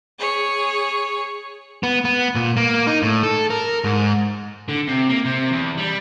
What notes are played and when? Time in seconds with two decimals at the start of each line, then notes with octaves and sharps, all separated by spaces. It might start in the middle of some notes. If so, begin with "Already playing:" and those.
0.19 G#4 C#5
1.83 B3
2.05 B3
2.35 A#2
2.57 A#3
2.87 D#4
3.03 A2
3.23 A4
3.50 A#4
3.84 G#2
4.68 D3
4.87 C3
5.09 A#3
5.25 C3
5.51 E2
5.78 G3